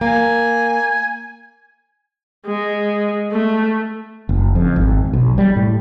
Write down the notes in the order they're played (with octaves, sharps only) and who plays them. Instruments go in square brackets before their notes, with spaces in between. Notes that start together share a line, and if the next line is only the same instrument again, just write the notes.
[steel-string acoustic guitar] A#3 [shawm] G#5
[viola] G#3
A3
[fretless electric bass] F#1
F2
G#1
B1
G3
A2